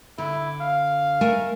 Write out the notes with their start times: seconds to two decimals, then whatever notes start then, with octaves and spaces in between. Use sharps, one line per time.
0.18 D3 E4
0.61 F5
1.21 A3 A#4 G#5